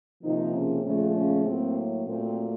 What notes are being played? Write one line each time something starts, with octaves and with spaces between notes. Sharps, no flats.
C3 D#3 F3 A#3 D#4
C#3 C#4
A#2 C#3 F3 A3 C#4
C#3 C#4
A2 F#3 A#3 C4
A#2 F#3 A3 C4